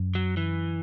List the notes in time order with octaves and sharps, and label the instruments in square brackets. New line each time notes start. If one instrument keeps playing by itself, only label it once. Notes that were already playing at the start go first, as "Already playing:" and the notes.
Already playing: [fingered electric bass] F#2
[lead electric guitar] F#3
E3